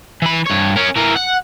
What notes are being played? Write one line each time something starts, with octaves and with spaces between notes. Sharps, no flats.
E3 B5
G2 C#5
C#4 A#4
E3 A#4
F#5